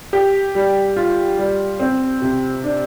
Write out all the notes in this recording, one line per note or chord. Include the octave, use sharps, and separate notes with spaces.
G4
G3
F4
G3
C4
C3
D4